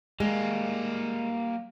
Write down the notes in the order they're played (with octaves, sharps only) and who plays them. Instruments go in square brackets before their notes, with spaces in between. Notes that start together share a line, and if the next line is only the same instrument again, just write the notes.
[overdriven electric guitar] G3 A#3 [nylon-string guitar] G#3